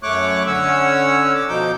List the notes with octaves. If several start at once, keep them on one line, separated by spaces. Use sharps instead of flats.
F#2 A3 C#5 C#6 D6 F#6
D3 C#4 C#5 F#5 E6
D6
B2 F3 D#4 D6 G6